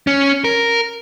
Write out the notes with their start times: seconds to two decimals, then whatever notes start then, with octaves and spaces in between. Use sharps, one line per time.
0.07 C#4
0.44 A#4